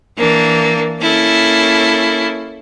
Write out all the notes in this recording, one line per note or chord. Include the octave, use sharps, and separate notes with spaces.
E3 A#3 D4
A#3 C#4 E4 A4